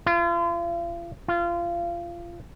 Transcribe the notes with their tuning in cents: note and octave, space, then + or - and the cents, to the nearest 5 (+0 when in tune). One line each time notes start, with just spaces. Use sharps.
F4 -40
F4 -25